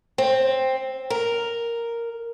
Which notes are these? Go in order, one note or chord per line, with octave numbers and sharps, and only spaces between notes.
C4
A#4